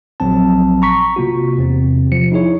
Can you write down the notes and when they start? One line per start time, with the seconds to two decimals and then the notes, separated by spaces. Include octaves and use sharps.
0.20 A#1 F#3 C4 A5
0.82 A#5 C#6 B6
1.16 C3 A#3 F4 F#4
1.58 E2 C3 C4
2.12 F3 C#7
2.32 D#4 E4 G#4 C#5